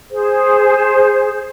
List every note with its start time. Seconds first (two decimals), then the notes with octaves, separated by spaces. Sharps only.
0.11 G#4 C5